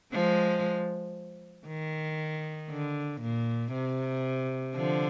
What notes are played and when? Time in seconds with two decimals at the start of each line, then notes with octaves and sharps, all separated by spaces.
0.13 F3 G#3
1.67 D#3
2.70 D3
3.21 A#2
3.73 C3
4.76 D3 F3